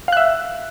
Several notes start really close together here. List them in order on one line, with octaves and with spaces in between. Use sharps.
F5 F#6 E5